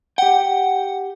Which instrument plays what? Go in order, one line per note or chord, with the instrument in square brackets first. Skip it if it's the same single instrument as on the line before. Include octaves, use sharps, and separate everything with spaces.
[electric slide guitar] G4 G5 [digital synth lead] F#5